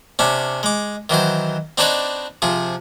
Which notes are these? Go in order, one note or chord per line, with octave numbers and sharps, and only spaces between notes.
C3 C#4 D4
G#3 D6
D#3 E3 F#3 C5
C4 D4 D#4 B4 C#5 D5
C3 F3 G#4